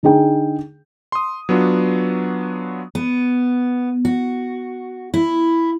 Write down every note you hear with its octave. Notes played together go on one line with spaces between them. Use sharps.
D3 D#4 G#4 G5
C6 D#6
F#3 B3 D4 F4 F#4
B3
F#4
E4